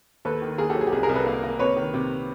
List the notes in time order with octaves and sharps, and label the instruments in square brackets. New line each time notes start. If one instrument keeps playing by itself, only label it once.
[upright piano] D#2 A4 B4
D#3
D#2 G#4 A#4
G4 A4
F#3
G#4
G4
C2 G#4
G#4 A#4
C2
A4 B4
A#3
A#3
C3 B4 C#5
D#3
C3